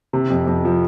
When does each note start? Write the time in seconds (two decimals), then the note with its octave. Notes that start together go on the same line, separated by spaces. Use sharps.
0.13 C3
0.30 F2
0.47 F2
0.65 F3